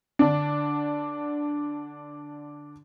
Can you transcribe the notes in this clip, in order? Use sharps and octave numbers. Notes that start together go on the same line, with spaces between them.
D3 D4